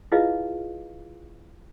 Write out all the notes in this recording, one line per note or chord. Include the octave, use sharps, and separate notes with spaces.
E4 F4 G#4 B4 D#5 F5